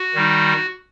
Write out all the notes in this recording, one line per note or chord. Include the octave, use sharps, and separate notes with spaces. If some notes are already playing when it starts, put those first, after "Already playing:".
Already playing: F#4
D#3 G3 D#4